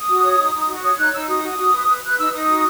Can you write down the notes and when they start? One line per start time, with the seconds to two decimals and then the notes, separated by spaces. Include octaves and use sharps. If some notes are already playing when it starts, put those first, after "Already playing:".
Already playing: D#6
0.08 F#4
0.23 C#5
0.39 D#4
0.53 D#4
0.69 F#4
0.83 C#5 D#6
0.98 D#4 F#6
1.13 D#4 E6
1.28 F#4 D#6
1.43 F#4
1.58 F#4
1.74 B4
1.88 B4
2.04 B4 F#6
2.18 D#4 E6
2.33 D#4 D#6
2.48 F#4